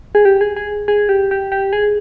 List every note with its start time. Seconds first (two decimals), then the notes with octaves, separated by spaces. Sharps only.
0.15 G#4
0.25 G4
0.41 G#4
0.56 G#4
0.88 G#4
1.09 G4
1.31 G4
1.52 G4
1.73 G#4